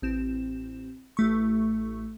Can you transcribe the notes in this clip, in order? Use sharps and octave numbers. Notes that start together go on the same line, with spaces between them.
A1 C4 E7
A1 A3 C#6